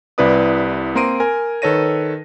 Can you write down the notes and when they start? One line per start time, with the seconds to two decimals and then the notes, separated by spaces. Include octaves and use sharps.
0.18 C2 C3 E4 B4 D5 D#6
0.95 A#3 C4 A#5 C6 D7 D#7
1.20 A#4 G#5
1.62 D#3 A4 B4 C#5 A#6 D#7